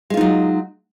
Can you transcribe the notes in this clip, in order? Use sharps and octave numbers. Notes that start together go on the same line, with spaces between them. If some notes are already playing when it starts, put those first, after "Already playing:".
F#3 G#3 D#4 F4